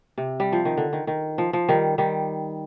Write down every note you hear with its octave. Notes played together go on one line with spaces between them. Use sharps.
C3
G3
F3
D#3
D3
D#3
D#3
F3
F3
D#3 G3
D#3 G3